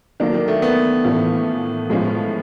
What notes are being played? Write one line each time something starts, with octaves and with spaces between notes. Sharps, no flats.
D3 D#3 F#3 A#3 D4
D#3
A3
B3
A2 E3 A3 C#4 F4
A2 F3 G#3 C#4 F4